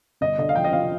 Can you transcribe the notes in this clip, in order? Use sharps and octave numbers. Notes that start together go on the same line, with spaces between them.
G1 D#5
D3 D#5
F5
F3 G5
D#5
F3 F5